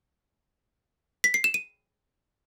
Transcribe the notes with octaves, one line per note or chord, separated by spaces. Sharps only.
B6
C7
E7
D#7